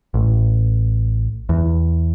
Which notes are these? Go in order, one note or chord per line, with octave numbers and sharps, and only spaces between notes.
A1
E2